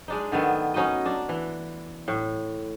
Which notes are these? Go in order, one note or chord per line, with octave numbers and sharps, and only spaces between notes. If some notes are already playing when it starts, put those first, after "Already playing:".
G#3 D4 D#4
D3 D#3 A3 B3
C#4 D#4 F#4 D#5
D4
E3
A2